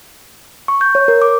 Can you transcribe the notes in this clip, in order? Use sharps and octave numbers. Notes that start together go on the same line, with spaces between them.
C#6
G6
C#5
A#4
D6